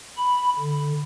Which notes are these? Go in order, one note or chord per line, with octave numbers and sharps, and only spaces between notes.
B5
D3